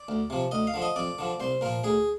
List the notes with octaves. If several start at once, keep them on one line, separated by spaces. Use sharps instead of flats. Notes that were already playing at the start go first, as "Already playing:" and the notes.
Already playing: D5
D2
C3 F3
D2 D#5
F5
D3 F3
D#5
F2 D5
D3 F3
C2 C5
A#2 F3 A#4
D2 G#4